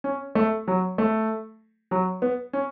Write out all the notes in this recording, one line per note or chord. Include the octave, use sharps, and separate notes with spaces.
C#4
A3
F#3
A3
F#3
B3
C#4